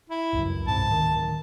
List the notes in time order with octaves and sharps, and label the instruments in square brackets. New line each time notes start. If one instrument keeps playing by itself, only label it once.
[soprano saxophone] E4
[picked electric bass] G1 C#2 F#2
[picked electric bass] C2 G#2 C3 [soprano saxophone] A5
[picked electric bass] D1 D#3